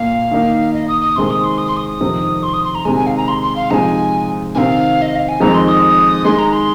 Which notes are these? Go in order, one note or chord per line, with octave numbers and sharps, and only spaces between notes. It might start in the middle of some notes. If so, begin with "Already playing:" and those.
Already playing: A#2 A#3 F5
D#3 A#3 D#4
D#5
D#6
D#6
C3 D#3 G#3 C4 C6
D#6
C6
D#6
C6
D#6
F2 C3 D#3 C4
C6
D#6
C6
A#5
C3 D#3 G#3 G#5
G#5
F5
A#5
C6
C6
F5
C3 F3 G#3 D#4 G#5 A#5
C3 D#3 C4 F5 G#5
D#5
F5
G#5
F2 D#3 G#3 C4 D#4 A#5
C6
D#6
D#3 G#3 D#4 C6
A#5
C6